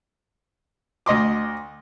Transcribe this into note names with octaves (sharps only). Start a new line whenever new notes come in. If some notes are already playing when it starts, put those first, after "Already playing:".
D2 D#5 C6 D6